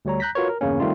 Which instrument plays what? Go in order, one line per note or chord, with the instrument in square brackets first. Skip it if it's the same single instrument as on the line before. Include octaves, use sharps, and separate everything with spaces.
[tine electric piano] D2 G3 C#5 A#5
A#5 F#6 G6 A#6 B6
F4 F#4 A#4 B4 C#5
A#4
E2 G2 C#3 A#3 C#4
D#3 G3 A3 C4 D#4 F4